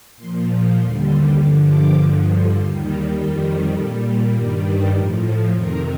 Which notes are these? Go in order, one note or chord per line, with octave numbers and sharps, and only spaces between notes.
A#2 F3 C6
A#5
D#2 D3 G3 C6
C6
G2 D3 F3 D6
D6
G2 D3 F3
D#2 D#3 G3 C6
A#5
F2 D#3 G3 G5
C5
A#2 G3 A4
G4
G2 D#3 G3 A#4
C5
A2 F3 A#4
A4
F2 C3 D#3 A#4